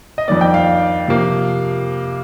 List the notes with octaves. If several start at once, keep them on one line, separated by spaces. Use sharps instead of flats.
D#5
F2 D#3 A#3 D5
G5
F5
C3 F3 A#3